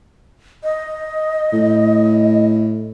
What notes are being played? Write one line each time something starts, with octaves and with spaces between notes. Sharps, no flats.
D#5
A2